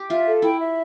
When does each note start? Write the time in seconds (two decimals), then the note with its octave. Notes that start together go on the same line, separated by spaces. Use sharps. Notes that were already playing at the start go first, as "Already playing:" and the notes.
Already playing: G4
0.10 F4 E5
0.26 A4
0.42 E4 G5
0.60 E5